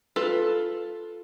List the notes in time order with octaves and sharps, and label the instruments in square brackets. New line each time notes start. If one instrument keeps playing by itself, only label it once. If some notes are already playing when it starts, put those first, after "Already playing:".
[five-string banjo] F4 A4 B4